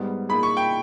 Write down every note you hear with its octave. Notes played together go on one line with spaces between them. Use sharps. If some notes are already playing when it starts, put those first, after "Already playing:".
Already playing: G#2 G3 B3
A#2 A#3 D#4 G#4 B5
C#6
G5